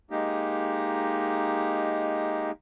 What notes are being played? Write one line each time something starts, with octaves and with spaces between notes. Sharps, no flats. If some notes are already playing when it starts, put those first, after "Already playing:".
G#3 A#3 D#4 G4